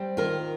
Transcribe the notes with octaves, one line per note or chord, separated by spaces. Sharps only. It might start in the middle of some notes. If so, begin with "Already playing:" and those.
Already playing: G3 C4
D#3 F4 A#4